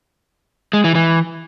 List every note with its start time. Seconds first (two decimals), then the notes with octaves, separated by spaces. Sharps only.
0.73 G#3
0.84 E3
0.95 E3